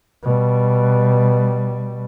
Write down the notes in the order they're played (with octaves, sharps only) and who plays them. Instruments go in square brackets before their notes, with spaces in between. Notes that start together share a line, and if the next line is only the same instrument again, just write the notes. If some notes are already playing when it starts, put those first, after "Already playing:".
[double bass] B2 G3